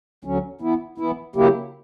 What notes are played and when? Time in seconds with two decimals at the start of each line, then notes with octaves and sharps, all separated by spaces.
0.24 D2 D3 F#3 C#4
0.61 E3 B3 E4
0.98 E3 B3 E4
1.36 C#3 F#3 A#3 E4 G4